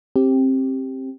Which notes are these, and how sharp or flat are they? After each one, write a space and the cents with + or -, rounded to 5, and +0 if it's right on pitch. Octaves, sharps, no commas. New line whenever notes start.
C4 +20 G4 +0